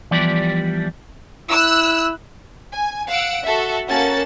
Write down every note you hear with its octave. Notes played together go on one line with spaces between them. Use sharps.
E3 F3 G3 B3 G4 D5
E4 E6 F#6
G#5
F5 F#5 E6 D7
F#4 A4 E5
A#3 C#4 F#4 A4 A5 A6